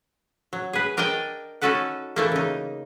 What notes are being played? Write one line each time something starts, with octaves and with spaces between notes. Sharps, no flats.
F#3
G#4 B4
D4 A#4 D5 D#5 G5
C#4 D#4 F#4 A4 B4 F#5
E3 A3 A#3
C#3 D#4